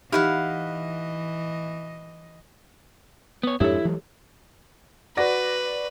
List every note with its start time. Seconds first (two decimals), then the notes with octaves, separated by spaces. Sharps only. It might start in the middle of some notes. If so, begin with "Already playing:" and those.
0.12 E3 D#4 E4 G4 D#5 F5 F#5
3.43 B3 C#5
3.60 F2 G#2 D4 E4 G4 A4 C#5
3.85 E3 F#3 G#3
5.17 F#4 B4 D5 A#6